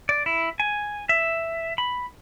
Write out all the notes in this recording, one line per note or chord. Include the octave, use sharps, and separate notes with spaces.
D5
E4
G#5
E5
B5